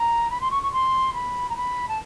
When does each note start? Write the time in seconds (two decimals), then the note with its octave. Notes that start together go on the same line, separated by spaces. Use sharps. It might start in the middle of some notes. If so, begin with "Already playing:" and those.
Already playing: A#5
0.30 B5
0.41 C6
0.51 C#6
0.63 C#6
0.72 C6
1.14 B5
1.49 A#5
1.56 B5
1.88 A5